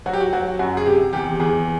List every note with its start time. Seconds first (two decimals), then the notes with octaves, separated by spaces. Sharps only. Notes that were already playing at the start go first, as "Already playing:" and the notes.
0.06 F#3 F#4
0.13 G4
0.20 F#4
0.33 F#3 F#4
0.59 F#2 F#4
0.77 G#4
0.86 C3 G4
1.13 E2 G4
1.40 E2 G#4